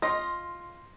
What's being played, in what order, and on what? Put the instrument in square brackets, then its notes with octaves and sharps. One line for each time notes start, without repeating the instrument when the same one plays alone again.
[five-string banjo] F4 D#5 [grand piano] C6 A#6